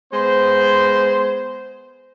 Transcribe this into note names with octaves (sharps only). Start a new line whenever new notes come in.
G#3 B3 C5